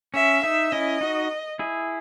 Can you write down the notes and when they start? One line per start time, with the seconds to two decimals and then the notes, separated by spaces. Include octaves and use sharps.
0.14 C#4 E5
0.43 D#4 E5
0.72 C#4 E4 D#5
1.01 D#4 F#4
1.59 E4 G#4